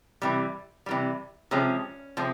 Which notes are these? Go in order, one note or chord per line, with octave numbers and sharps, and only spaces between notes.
C3 E3 G3
C3 E3 G3
C3 F3 G#3 C#4
C3 F3 G#3